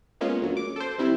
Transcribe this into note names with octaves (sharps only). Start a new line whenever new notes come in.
G#3 A#3 B3 C#4 F4
D2 F#3
D6
A4 C5
D#3 G3 C4 E4